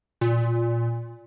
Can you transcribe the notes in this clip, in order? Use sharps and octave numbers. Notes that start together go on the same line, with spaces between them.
A#2